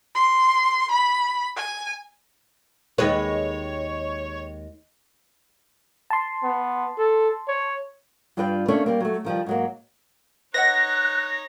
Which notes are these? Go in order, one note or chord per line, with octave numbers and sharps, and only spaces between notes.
C6
B5
G#5
D#2 G#3 B4 C#5
A5 C6
B3
A4
C#5
G2 G3 F4 B4 D5 G5
A3 A#3 C#4 D4 C#5
G3 A#3
F#3 A3
D#3 F3 G3
G#2 F#3 A#3
D#4 B4 C#5 D#5 F#5 F#6 A#6